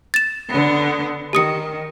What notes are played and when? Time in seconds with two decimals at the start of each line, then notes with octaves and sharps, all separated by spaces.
0.14 A6 E7
0.49 D3 B3
1.33 D#3 G4 D#6 C#7